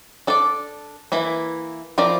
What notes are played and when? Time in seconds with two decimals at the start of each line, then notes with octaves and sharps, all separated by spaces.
0.27 D4 A4 D5
1.12 E3 A#3 E4
1.98 F3 C4 E4 A#4 D5